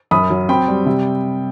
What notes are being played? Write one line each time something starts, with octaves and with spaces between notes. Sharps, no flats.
F#2 B5 D#6
F#3
C4 G5 B5
G3
C3